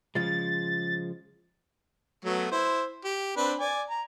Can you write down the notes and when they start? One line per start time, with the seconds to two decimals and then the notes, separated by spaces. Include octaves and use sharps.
0.15 C#3 F3 G#3 A6
2.25 F#3 A3 B3
2.52 E4 C5
3.05 G4
3.37 C4 D4 B4
3.60 D5 G#5
3.90 A#5